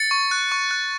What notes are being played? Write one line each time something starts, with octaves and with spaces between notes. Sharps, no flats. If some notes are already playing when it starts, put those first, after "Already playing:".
Already playing: A6 C#7
C#6
F#6
C#6
F#6